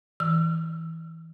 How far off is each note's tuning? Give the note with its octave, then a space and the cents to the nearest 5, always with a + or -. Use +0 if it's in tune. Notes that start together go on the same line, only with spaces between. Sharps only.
E3 -20 E6 +0